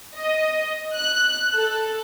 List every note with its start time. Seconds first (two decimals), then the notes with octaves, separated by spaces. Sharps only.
0.15 D#5
0.95 F#6
1.53 A4